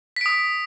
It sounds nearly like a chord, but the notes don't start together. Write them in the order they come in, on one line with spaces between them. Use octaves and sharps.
B6 D7 D#6